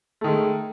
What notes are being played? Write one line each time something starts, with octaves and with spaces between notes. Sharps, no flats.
D#3 G#3 A3